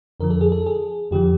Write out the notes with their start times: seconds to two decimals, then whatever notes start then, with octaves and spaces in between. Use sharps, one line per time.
0.20 F2 D3 F3 A#4
0.30 A4
0.41 G#4
0.52 A4
0.66 G#4
1.11 F2 D3 F3 G4